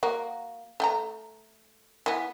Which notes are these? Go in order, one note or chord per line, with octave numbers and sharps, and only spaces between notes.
A#3 F#4
A3 G5 A#5
E3 B3